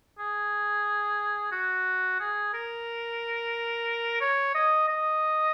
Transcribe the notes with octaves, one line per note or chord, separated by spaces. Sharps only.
G#4
F#4
G#4
A#4
C#5
D#5
D#5